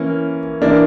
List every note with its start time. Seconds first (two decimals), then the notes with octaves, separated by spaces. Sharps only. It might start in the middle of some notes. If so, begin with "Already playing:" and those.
Already playing: E3 A#3 C#4
0.62 E3 A#3 D4